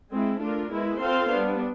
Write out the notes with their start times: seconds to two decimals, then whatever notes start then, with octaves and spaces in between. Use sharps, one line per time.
0.11 G#3 C4 E4
0.40 A3 D4 F4 A#4
0.71 G#3 B3 E4
1.01 C4 F4 A4 C5 F5
1.32 G3 B3 D4